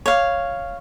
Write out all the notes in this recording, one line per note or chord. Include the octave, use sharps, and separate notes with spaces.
C#5 F5